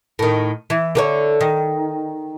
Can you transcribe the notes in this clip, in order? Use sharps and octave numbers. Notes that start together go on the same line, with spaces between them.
A2 D#3
E3
D3 A4 C#5
D#3